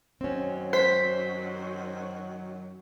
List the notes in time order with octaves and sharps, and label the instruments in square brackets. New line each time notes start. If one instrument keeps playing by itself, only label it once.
[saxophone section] F#2 D#3 F#3 [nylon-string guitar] C4 C#4
[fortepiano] C5 [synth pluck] B6